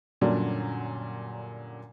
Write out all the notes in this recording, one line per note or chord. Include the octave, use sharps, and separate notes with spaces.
F#2 A#2 D3 F#3 G3 D4